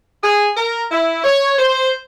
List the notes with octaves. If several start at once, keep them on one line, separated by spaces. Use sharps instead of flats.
G#4
A#4
E4
C#5
C5